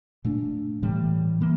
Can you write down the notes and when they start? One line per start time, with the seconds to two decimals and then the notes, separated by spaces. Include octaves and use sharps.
0.25 A#2 A3 D4
0.83 A2 E3 G3
1.41 E3 A#3